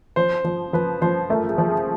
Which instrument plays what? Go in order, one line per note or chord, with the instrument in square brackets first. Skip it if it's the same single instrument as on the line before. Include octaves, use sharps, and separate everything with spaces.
[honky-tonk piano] F3 [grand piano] C5
[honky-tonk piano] F3
[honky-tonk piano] F3 [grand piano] B4
[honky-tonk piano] F3 [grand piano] C5
[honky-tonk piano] A3 [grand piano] A#4
[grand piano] G#4
[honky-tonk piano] F3
[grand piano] G#4